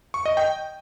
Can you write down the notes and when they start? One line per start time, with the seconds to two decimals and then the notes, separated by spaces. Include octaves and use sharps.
0.14 C#6
0.26 D#5
0.37 G5